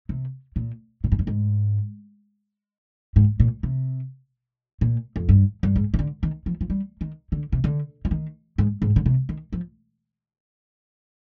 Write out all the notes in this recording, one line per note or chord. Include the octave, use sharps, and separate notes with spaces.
C3
A#2
A#2
G#2
G2
G#2
G#2
A#2
C3
A#2
F2
G2
G2
G#2
C3
D3
D#3
F3
F3
G3
D#3
D3
C3
D3
F3
D#3
G#2
G#2
D3
C3
D#3
F3